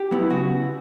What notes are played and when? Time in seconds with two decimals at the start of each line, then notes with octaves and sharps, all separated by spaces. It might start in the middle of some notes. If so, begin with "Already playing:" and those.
Already playing: G4
0.11 F#3 B3 E4
0.30 C#3 F#4